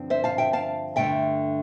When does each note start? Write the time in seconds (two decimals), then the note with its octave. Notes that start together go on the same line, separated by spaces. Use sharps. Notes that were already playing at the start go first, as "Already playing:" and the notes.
Already playing: G2 D3 F3 C4
0.10 C5 E5
0.24 F5 A5
0.38 E5 G5
0.53 F5 A5
0.96 G2 D3 A3 E5 G5